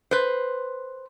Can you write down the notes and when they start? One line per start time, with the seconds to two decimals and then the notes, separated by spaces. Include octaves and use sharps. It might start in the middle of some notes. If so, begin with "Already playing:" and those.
0.11 B4 C5